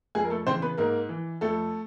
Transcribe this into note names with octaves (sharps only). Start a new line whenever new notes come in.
F2 G#3 G#4
A#4
A3 A4
C#3 E3 C4 C5
B3 B4
G#2 A#3 A#4
E3
F2 A3 A4